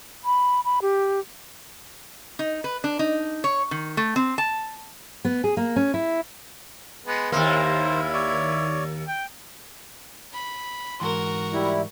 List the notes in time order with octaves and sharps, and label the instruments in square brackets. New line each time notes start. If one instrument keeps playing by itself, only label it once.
[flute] B5
B5
G4
[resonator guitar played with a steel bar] D#4
B4
D4
D#4
C#5
D#3
A3
C4
A5
[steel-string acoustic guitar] B3
G#4
A#3
C#4
E4
[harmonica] G#3 B3
[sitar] D#2 A#3 [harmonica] E4 [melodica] C5
[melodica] C#5 D5
[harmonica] G5
[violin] B5
[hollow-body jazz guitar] G#2 E3 C6 [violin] F#4 A#4
[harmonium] G3 E4